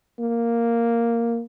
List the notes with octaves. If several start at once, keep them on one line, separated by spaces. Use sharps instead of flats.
A#3